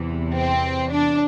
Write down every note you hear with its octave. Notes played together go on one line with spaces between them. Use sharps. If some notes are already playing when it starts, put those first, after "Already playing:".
Already playing: E2 C3 E3
C4
D4